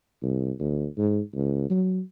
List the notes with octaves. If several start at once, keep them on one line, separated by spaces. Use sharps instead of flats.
C2
D2
G#2
C#2
F#3